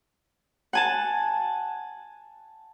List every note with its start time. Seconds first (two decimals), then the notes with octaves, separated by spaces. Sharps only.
0.73 F#5 G#5 A5